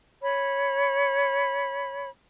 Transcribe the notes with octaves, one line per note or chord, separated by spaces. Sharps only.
C#5 B5